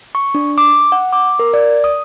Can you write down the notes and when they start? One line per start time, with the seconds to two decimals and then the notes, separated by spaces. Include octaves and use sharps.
0.15 C#6
0.35 D4
0.58 D6
0.92 F#5
1.13 D6
1.39 A#4
1.54 D5
1.84 D#6